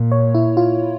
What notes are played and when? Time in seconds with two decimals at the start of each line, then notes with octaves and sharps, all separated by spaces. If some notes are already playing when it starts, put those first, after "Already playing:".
Already playing: A#2
0.12 C#5
0.35 E4
0.57 F4